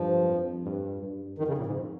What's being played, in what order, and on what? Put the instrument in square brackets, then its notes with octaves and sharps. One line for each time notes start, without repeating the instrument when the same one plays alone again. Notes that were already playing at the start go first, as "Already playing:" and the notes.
Already playing: [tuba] G2 [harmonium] F3
[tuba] F2
G2
G2
[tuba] F2 [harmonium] D#3
[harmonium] C#3
A#2
G#2